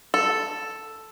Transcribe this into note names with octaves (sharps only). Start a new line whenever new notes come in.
A4